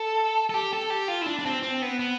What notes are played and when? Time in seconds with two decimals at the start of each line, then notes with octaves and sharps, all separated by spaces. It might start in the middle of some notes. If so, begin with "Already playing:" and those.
Already playing: A4
0.50 A4
0.54 G4
0.73 A4
0.90 G4
1.08 F4
1.21 E4
1.26 D4
1.39 D4
1.46 C4
1.63 C4
1.82 B3
1.99 B3